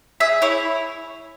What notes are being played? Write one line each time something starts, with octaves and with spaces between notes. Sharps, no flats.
G#4 E5
E4 C#5